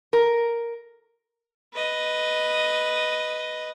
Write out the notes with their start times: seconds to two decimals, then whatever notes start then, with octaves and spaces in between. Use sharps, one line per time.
0.13 A#4
1.74 B4 D#5